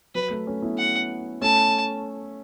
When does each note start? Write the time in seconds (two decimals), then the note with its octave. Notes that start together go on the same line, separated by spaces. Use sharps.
0.15 F#3 B4
0.30 A3
0.47 A3 C#4
0.62 B3 E4
0.78 F#5
1.41 A3 C#4 A5